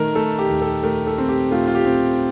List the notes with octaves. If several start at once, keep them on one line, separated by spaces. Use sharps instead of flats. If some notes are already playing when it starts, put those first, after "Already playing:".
Already playing: D#3 A3 A#4
A3 A4
G4
D#2
A4
A3 A#4
A4
C4
G4
A3 F4
F4
G4
C4